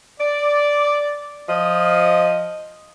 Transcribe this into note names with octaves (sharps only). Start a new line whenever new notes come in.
D5
F3 D#5